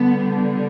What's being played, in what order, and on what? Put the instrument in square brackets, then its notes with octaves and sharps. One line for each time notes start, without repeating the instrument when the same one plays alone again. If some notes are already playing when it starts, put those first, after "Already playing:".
Already playing: [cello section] D3 G3 B3